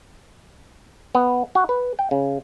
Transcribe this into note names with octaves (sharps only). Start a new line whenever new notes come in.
B3
F#4
B4
G5
C#3